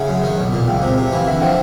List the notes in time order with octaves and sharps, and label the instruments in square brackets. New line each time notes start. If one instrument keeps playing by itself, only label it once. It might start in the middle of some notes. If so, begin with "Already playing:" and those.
Already playing: [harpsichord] C#3 [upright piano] E5 F#5
[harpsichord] F#2
D#3
B1
A#2
[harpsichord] C#2 [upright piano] F5 G5
[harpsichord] C3
C3
[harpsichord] E3 [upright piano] F5
[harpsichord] D3 [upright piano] E5 F#5
[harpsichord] F3 [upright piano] F5 G5